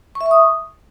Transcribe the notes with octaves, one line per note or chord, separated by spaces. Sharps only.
C#6
E5
C#6
D#6